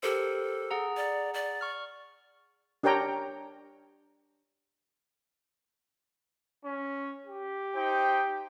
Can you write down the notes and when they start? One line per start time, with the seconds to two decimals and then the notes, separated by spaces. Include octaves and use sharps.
0.03 G4 A4 A#4 C5
0.71 G#4 F#5 A#5
0.97 D5
1.34 D5
1.61 C#6 F6
2.83 D4 G4 A#4 C#5 G5 A#5
6.64 C#4
7.26 G4
7.76 D#4 C5 G5